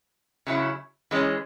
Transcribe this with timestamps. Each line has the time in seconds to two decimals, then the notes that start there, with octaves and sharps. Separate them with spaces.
0.47 C#3 F#3 E4
1.11 E3 G#3 C#4